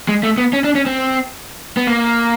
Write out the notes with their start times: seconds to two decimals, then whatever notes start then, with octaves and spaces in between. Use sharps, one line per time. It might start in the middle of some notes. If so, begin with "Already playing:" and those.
0.08 G#3
0.23 A3
0.38 B3
0.53 C#4
0.64 D4
0.75 C#4
0.86 C4
1.77 B3
1.87 A#3